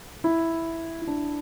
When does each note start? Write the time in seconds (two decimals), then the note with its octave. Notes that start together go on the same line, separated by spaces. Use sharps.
0.24 E4
1.02 E4
1.07 D4